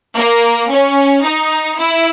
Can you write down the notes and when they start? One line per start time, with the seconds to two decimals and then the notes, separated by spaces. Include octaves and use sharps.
0.16 A#3
0.70 C#4
1.24 D#4
1.78 E4